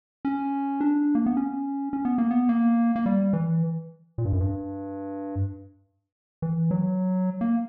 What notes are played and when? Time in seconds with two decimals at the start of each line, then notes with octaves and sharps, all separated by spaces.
0.25 C#4
0.81 D4
1.15 A#3
1.26 B3
1.37 C#4
1.93 C#4
2.05 B3
2.18 A#3
2.31 B3
2.49 A#3
2.96 A#3
3.06 G3
3.33 E3
4.18 A#2
4.25 G2
4.33 F#2
4.40 G2
6.42 E3
6.71 F#3
7.41 A#3